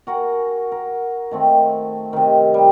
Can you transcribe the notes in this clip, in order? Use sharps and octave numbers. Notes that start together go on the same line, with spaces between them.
F#4 A#4 F#5 G#5
A#4
D#3 A3 C4
C3 D#3
G3 D#4